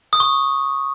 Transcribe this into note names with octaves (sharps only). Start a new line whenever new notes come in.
D#6
C#6